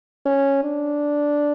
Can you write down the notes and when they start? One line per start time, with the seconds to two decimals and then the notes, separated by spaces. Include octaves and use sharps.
0.26 C#4
0.63 D4